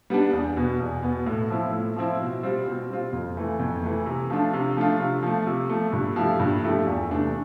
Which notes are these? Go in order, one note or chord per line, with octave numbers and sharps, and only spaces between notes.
G3 B3 D4
E2
B2 B3
E2
B2 B3
A2
F3 C4 E4
A2
F3 C4 E4
B2
G3 C4 F4
B2
G3 C4 F4
F2
E3 A3
F2
E3 A3
C3
F3 A3 D4 F4
C3
F3 A3 D4 F4
C3
F3 A3
C3
F3 A3
G2
F3 A3 E4 G4
G2
F3 A3 E4 G4
E2
C3 E3 A3 D4